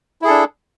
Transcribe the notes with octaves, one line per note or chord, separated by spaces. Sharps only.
D4 E4 G#4 A4